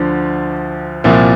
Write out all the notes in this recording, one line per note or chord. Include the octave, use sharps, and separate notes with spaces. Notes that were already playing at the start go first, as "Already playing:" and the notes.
Already playing: D2 D3 F3 D4
C2 A#2 F3 E4